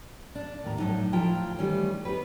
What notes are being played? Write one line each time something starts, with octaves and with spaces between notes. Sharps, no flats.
D4
D#2 A2 A#5
A2 F#3 C4 D4 D#4
D2 F3 E4 F4 G5 A#5
D#3 E3 G3 A3 C#4
B3 D#4 G4 B4